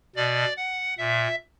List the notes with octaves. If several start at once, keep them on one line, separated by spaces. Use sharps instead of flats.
B2 D5
F#5
A#2 E5